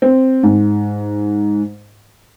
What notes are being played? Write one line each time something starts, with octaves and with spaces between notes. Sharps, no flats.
C4
G#2